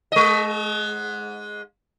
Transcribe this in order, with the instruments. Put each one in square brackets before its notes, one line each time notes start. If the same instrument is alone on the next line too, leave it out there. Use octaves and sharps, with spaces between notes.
[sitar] G#3 D#5